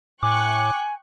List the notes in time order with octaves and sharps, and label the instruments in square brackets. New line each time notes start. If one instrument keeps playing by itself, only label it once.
[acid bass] A2 [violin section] G5 C#6 F#6 [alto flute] G#5 [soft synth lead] D6